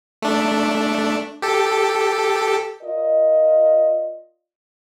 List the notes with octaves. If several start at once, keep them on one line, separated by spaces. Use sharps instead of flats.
A3 D4
G4 A4
F4 A#4 D5 D#5